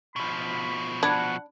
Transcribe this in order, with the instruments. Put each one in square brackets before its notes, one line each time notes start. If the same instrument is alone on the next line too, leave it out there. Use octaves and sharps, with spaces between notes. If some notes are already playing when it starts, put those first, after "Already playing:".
[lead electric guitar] B2 F3 [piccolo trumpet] B5
[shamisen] D4 [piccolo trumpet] F#5 [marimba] A5 B5 G#6